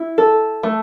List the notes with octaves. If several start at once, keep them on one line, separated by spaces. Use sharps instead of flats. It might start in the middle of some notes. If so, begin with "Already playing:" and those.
Already playing: E4
A4
A3